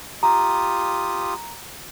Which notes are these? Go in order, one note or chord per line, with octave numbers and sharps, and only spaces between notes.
F4 G4 A#5 D#6